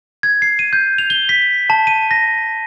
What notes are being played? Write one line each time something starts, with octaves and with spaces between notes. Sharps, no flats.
G#6
C7
D#7
G6
F7
G7
B6
A5
D#7
A#6